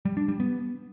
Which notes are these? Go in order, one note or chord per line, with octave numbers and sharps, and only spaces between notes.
G3
D4
G3
B3